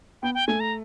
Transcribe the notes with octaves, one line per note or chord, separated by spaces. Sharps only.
B3 G5
G5
A3 G#5
A#5